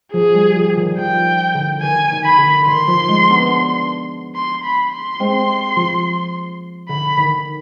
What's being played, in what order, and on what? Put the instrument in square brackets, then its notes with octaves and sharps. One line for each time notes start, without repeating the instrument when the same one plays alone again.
[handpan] F3 [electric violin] G#4
[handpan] G3
F3
D#3
[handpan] F3 [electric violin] G5
[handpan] D3
[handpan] D#3 [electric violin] G#5
[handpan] D#3
[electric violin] B5
[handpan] D3
[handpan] D#3 [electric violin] C6
[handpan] F3
G#3
B3 D4
[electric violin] C6
B5
C6
[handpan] G#3 C4
F3
[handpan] D3 [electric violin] B5
[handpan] D#3